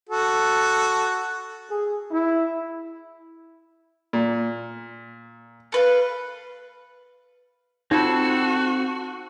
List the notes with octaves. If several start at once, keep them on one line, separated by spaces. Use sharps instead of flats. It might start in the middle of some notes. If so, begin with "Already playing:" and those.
F#4 A4
G#4
E4
A#2
A4 B4 F5
C4 D#4 F4 F#4 A4